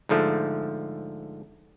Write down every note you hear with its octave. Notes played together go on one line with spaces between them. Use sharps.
G#2 D3 F3 A3